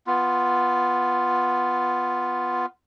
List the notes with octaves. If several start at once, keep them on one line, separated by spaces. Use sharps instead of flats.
B3 F4